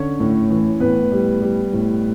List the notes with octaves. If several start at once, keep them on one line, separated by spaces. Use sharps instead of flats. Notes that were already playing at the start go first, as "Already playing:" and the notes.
Already playing: D3 C#4 C#5
A2
E3
A2 B3 B4
G3
G3
A2